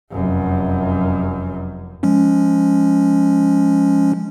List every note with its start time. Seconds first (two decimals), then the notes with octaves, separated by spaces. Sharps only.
0.12 F1 F#2
2.03 F3 G#3 C#4